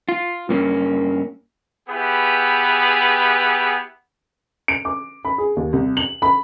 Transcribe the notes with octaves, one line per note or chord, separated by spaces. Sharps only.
F4
G2 A#3 C#4
B3 E4 G4 G#4 B4
D7
D6
B5
G#4
D#2
C2
F#7
B5